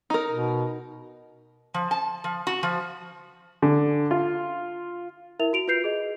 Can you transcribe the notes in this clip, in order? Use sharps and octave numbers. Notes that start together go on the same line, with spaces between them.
D#4 A#4
B2
F3
A5
F3
F#4
F3
D3
F4
E4 A#4 E5 F7
F#4 D7 F7
F4 B4 G6 C7 F7
G#4 D#5